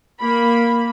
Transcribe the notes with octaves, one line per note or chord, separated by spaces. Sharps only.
A#3 B5